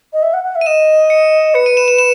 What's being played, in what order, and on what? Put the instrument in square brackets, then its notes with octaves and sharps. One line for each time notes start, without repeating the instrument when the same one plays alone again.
[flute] D#5
E5
F#5
F#5
E5
[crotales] D#7
[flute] D#5 [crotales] E7
[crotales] C#7
[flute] B4 [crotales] C#7
[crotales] D#7
E7
E7
E7